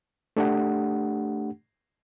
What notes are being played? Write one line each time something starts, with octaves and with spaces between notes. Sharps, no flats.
A3 D4 G4 F#5